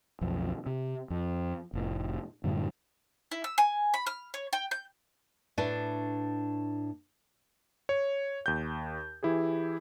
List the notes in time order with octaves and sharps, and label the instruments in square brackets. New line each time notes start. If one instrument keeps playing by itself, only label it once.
[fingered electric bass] B1 F2
C3
F2
F1 A2
F#2 A2 D3 G3
[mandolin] E4
E6
G#5
B5
F6
C#5
G5
G6
[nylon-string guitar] A2 D4 B4 A5
[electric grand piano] C#5
D#2 G6
E3 E4 G4 G#4